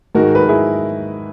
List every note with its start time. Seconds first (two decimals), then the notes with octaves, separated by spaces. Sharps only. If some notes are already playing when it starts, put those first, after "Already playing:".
0.15 G#2 D#3 G#3 F#4 A#4
0.35 B4
0.42 A#4
0.49 E4 G#4